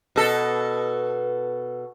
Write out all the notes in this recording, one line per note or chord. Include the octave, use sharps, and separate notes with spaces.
B2 A4